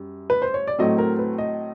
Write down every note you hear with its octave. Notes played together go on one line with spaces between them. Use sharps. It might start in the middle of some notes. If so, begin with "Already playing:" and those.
Already playing: F#2 G3
B4
C5
C#5
D5
A2 F#3 A3 C4 D#5
A#4
B4
D#5